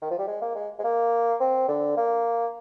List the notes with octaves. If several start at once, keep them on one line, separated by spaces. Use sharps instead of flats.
D#3
F3
G3
G#3
A#3
G#3
G#3
A#3
C4
D3
A#3